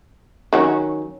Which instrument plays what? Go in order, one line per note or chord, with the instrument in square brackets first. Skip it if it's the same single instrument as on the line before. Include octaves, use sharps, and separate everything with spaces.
[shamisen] D#3 F#3 C#4